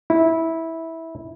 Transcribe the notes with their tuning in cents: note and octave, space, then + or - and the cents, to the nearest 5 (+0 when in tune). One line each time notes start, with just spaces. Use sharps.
E4 -15